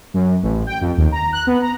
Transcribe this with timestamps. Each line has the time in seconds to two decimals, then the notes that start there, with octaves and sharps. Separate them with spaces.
0.14 F#2
0.43 A1
0.67 G5
0.81 F2
0.98 D#2
1.12 A#5
1.33 F#6
1.47 B3
1.62 A#5